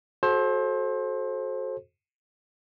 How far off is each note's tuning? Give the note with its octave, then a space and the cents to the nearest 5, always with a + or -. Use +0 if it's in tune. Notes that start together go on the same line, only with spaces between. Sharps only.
F#4 +0 A4 -25 C5 +25